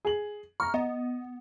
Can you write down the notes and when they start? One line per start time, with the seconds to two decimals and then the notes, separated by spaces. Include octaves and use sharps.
0.05 G#4 F#7
0.60 A#5 C#6 F6
0.74 B3 D#5